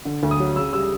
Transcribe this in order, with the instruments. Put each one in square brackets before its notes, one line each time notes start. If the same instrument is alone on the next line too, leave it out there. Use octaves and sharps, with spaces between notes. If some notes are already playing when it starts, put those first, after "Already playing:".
[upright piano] D3
D2
D#6
F#3
C#3 E6
G3 E6